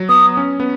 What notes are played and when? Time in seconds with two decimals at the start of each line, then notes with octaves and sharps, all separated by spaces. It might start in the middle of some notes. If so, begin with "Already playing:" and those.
Already playing: F#3
0.09 B3 D#6
0.37 C#4
0.60 B3